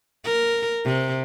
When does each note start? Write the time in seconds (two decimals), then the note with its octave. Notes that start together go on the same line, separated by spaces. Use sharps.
0.24 A#4
0.85 C3